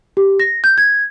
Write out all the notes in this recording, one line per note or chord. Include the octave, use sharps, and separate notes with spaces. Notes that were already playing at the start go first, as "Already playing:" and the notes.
G4
A#6
G6
G#6